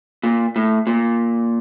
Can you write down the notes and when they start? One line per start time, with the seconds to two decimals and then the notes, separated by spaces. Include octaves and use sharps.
0.23 A#2
0.56 A2
0.87 A#2